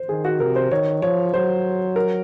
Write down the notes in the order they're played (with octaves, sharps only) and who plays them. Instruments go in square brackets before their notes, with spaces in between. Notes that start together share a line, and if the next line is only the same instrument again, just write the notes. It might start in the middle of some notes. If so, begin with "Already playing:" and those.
Already playing: [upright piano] C5
[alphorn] D#3 [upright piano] G#4
[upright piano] F#4
[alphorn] C3 [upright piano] A#4
[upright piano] C5
[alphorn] D#3 [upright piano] C#5
[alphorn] F3 [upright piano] C#5
[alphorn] F#3 [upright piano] C5
[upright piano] A#4